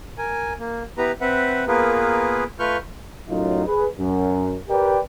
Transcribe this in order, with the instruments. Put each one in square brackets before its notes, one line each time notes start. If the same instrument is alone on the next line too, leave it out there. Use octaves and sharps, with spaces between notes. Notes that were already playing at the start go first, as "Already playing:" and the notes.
[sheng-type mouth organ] A#4 G#5
A#3
B3 E4 G4 B4 A#5
C4 B4 E5 F#5
A#3 B3 F4 G#4 A#4 B4
A3 F4 B4 C#6 F6 G6
[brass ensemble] F#2 A2 F#3 D#4 F4
G#4 B4
F#2
G4 A#4 B4 D5 G5